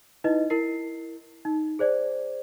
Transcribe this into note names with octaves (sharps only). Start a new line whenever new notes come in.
D#4 E4 B4 D#5
E4 A#4 C7
D#4
G#4 C5 D5